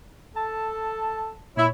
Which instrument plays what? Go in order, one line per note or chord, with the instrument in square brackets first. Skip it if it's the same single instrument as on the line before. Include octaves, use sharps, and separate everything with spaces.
[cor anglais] A4 [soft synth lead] A5
[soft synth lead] A#2 [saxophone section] E4 [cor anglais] C#5